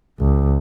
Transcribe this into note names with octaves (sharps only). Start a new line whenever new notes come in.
C#2